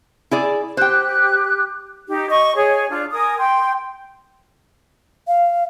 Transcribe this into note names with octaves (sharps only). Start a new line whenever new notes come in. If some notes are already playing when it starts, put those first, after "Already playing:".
E4 G#4 D5
G4 C5 G5 F#6
D#4 G4
D#5 C#6
G#4 C#5
D4 F4
A#4 G#5 D#6
G5 C6
F5